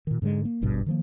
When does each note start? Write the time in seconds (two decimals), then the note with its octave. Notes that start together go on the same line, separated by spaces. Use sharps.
0.07 A#2 D#3
0.22 G#2 D3 G3 G#3
0.45 A#3
0.61 D1 G#1 G2 B2
0.86 D#3 F3 A#3